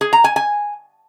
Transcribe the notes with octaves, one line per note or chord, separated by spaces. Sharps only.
G#4
A#5
G#5
G#5